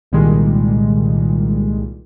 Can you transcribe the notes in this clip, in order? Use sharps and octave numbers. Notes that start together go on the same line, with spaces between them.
C2 A#2 D#3 G3 G#3